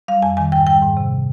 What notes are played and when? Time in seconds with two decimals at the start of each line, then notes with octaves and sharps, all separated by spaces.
0.08 G3 F5
0.22 F2 G#5
0.37 D#3 G#5
0.52 G#2 G5
0.67 G3 G5
0.82 G#2
0.97 C3